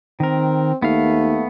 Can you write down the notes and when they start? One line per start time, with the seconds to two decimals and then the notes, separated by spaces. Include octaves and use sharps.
0.20 D#3 C4 A#4
0.82 D#2 A3 B3 F5